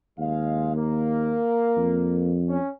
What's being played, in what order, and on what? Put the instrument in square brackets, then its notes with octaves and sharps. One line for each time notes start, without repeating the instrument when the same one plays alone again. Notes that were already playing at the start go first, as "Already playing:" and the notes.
[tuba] D#2 [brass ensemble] G#3 F5
[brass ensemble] A#3
[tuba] F2
[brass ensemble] C#4